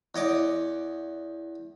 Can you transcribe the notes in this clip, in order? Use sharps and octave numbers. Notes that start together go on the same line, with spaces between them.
E2 C#5 D#5 D6